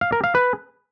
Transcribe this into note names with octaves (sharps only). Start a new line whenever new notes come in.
F5
A#4
F5
B4